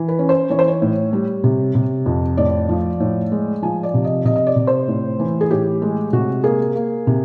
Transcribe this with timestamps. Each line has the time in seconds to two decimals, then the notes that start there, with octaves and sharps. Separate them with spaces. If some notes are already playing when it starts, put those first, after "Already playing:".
Already playing: E3
0.08 B4
0.19 C#4
0.29 C5
0.50 E3 C#5
0.59 C5
0.68 C#5
0.82 A2
1.13 G3
1.44 C3
1.75 C3
2.06 F2
2.37 A2 D5
2.69 F3
3.00 A2
3.32 G#3
3.62 F3 G#5
3.83 D5
3.94 C3
4.04 D#5
4.25 C3 D#5
4.36 D#5
4.47 D5
4.56 C3
4.67 C5
4.88 A2
5.19 E3
5.41 G#4
5.51 A2 G4
5.82 G#3
6.13 C3 F#4
6.44 A#3 G#4
6.76 A#3
7.07 C3